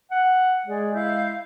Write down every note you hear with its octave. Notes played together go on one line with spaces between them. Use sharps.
F#5
G#3 G#4 D5
E4 F5 G6